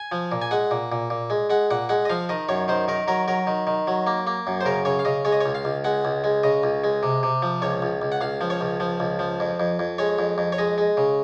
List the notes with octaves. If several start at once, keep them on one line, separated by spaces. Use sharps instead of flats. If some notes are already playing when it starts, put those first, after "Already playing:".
Already playing: G#5
F3
A#2
G#5
G#3 F#5
A#2
A#2
A#2
G#3
G#3 F#5
A#2 F#5
G#3 F#5
D#5
F3 F5
D#3 D#5
F#2 C#5
D#3 C5
D#3 A#4
F#3 A#4
F#3 A#4
D#3
D#3
F#3
A#3
A#3
F#2
C5
C#3 A#4
C#3 C#5
F5
C#3 D#5
G#3 C#5
D#5
C#5
C#2
F5
C#2
G#3 F#5
C#2
G#3
C#3 D#5
C#2
G#3
C3
C3
F3
C#2 C#5
C#2
C#2
F#5
C#2 F5
F3
C#5
C#2
F3
C#2
F3
F2
F2
F2
G#3 C#5
F2
F2
C#5
G#3 D#5
G#3
C#3